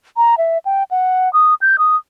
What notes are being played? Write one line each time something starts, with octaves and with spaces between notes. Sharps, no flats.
A#5
E5
G5
F#5
D#6
G6
D#6